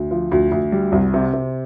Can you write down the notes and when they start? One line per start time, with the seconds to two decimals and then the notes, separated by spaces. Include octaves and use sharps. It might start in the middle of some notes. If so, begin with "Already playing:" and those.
Already playing: D2
0.11 F3
0.32 D2
0.52 D2
0.72 G3
0.92 C2
1.14 C3
1.34 C3